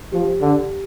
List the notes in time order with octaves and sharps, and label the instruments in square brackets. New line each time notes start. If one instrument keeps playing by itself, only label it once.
[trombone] F3 [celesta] G4
[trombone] D3